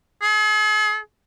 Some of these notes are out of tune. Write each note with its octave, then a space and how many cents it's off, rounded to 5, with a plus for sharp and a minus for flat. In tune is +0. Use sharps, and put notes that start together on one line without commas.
G#4 +45